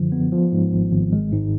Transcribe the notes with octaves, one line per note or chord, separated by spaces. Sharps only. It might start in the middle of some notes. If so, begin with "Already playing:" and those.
Already playing: F#2 D3 F3
B3
F3
G#2
G#1
G#1
G#3
G#2